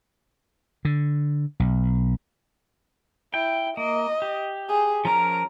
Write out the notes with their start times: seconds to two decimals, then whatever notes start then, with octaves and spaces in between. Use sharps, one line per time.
0.85 D3
1.60 B1
3.34 E4 G5
3.77 A#3 D#5
4.22 G4
4.69 G#4
5.05 F3 C#4 A#4 A#5